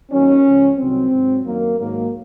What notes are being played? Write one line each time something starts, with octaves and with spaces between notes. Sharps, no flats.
D#2 D#3 F#3 C#4
C#2 C#3 F3
C2 C3 D#3 F#3 C4
G#2 F#3
F#2 D#3 F#3 A#3
G#2 D#3 F#3 A#3